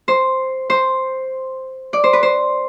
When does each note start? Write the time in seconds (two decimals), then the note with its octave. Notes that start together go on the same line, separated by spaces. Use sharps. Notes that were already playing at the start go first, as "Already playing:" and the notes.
0.08 C5
0.70 C5
1.93 D5
2.04 C5
2.13 B4
2.23 C5